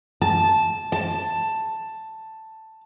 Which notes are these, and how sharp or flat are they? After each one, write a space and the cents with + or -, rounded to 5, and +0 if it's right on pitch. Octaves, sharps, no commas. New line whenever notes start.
A5 -10
A5 +5